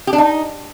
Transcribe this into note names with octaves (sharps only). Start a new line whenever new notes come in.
G4
D4
D#4